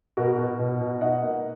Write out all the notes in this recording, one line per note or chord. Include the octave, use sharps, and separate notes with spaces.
B2 F#4 A#4
B2
B2
B2
D#4 D#5 F#5
A#3